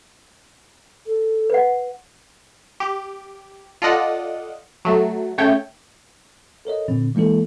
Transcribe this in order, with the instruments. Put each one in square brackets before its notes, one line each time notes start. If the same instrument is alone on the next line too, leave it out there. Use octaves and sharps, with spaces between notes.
[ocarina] A4
[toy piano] B4 F#5
[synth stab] G4
F4 A4 D5 D#5 F#5
F#3 A3
C#3 A3 C#5 G5
[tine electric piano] A4 A#4 C#5 D#5
A#2 D3 C4
E3 G#3 A#3 E4 A4